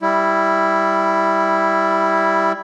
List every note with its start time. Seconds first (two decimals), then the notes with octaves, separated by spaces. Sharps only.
0.02 G3 E4